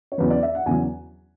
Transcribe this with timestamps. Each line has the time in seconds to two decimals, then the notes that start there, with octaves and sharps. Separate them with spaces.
0.12 C#5
0.18 E2 C#3 F#3 B4
0.30 D5
0.43 E5
0.55 F#5
0.66 E2 C#3 F#3 G#5